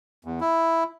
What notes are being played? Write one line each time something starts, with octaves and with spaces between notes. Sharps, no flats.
E2
E4